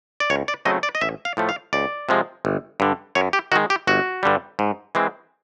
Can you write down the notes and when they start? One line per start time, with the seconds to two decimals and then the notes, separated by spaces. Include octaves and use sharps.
0.20 D5
0.30 C#2 C#5
0.48 D5
0.65 C#3 F#3 A3 C4 D#5
0.83 D5
0.95 D#5
1.01 A1 E5
1.25 F5
1.37 A2 F3 A3
1.49 F5
1.73 C#2 D5
2.09 C3 F3 G#3
2.45 G1
2.80 G2 D3
3.15 F#2 C#5
3.33 G4
3.52 D#3 G#3 F#4
3.70 G4
3.87 G1 F#4
4.23 G2 D3 G3
4.59 G#2
4.95 E3 G#3 C4